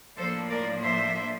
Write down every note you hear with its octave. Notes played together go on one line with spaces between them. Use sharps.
A2 F3 A#3 D4 A4 C5
A#4 D5
C5 E5